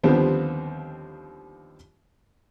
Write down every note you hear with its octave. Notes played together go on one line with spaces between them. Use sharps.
D#2 D3 F3 G3 B3 C4